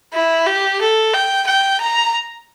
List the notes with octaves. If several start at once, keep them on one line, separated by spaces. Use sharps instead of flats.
E4
G4
A4
G5
G5
A#5